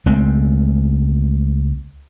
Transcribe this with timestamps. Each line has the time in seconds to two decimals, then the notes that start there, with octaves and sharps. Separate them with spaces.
0.06 C#2 G#3 A3 C4